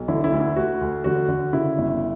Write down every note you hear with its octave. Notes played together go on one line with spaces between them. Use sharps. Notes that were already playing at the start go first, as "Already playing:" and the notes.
Already playing: B1
D3 E4
E4
D2
E4
D2 F#4
D2
D3 F#4
D3
C#3 E4
G1